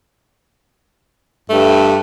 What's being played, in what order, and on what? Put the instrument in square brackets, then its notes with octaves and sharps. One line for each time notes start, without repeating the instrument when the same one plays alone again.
[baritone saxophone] G2 [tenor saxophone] A3